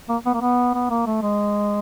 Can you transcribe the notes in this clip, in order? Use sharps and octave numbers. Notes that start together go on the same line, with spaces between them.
A#3
B3
A#3
B3
B3
A#3
A3
G#3